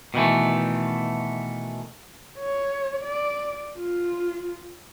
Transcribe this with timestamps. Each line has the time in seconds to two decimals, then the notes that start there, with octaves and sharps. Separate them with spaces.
0.14 B2 D#3 E3 A3
2.39 C#5
3.04 D5
3.76 F4